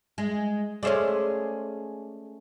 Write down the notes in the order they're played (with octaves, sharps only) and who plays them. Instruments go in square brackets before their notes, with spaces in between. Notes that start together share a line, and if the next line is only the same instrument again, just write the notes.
[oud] G#3
[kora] G#3 A3 C#4 [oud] G#4 C5 D5